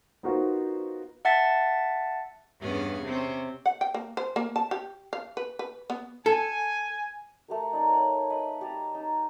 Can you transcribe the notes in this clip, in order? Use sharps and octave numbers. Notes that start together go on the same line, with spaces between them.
B3 D#4 F4 F#4 A#4 C5
E5 F#5 A5 A6 B6
E2 G2 B3 C#4 G#4
C3 C4 C#4
F#5
G5
A#3
C5
A#3
A5
G4
F5
B4
B4
B3
A4 G#5
A3 G4 A#4
D#4 D5
C#5 F#5
B4 D#5 B5
G4 A5 A#5
D#4